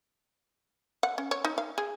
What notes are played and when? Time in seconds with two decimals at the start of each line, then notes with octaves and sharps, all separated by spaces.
1.03 F#5
1.18 C#4
1.31 C#5
1.45 D#4
1.58 F5
1.78 G#4